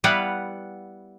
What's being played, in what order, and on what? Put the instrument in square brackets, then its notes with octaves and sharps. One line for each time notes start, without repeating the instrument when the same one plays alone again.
[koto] G3 B3 E4 B4 F5 F#5